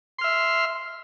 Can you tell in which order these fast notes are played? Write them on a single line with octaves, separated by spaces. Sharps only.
C6 F6 E5